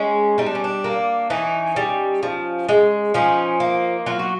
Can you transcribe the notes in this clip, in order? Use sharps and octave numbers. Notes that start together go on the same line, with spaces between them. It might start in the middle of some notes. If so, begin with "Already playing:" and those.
Already playing: G#3 C#4
G3 D#4
D4
C#4
D4
A#3
E3 C#4 D#4
G3
F3
G#3
F3 C#4 D#4
A#3
F#3 F4
F#4